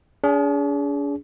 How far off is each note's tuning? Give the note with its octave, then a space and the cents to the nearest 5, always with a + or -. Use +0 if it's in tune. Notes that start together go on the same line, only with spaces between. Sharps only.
D4 -45 G#4 +0